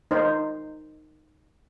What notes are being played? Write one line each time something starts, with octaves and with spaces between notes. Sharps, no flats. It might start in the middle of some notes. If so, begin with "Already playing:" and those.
D#4 C5